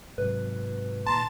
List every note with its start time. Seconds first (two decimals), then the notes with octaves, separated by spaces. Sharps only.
0.18 G#2 C3 F#3 B4
1.06 A#2 D#3 A5 A#5 C6